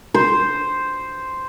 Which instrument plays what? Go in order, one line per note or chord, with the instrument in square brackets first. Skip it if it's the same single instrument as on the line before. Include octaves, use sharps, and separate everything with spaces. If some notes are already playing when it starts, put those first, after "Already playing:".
[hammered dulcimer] C5